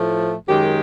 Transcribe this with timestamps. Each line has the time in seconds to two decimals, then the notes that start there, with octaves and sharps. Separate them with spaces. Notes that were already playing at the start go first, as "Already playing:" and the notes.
Already playing: A2 F3 A3
0.48 F#2 D#3 G#3 G4